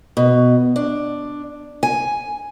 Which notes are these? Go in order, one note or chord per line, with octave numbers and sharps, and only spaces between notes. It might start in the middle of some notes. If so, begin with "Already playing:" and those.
B2
D4
G#5